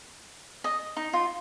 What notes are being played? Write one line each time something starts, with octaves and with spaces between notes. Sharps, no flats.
D#5
D#4
F4